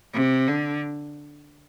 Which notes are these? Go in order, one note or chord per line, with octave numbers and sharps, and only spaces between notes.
C3
D3